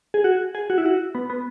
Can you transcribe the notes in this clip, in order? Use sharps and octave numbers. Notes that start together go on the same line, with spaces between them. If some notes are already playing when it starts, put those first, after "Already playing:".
G#4
F#4
G#4
F#4
E4
F#4
B3
B3